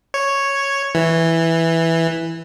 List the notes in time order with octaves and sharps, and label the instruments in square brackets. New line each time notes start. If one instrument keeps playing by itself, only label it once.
[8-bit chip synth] C#5
E3